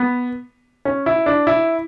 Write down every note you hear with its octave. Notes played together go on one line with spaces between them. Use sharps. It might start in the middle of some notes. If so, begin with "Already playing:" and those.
Already playing: B3
C#4
E4
D4
E4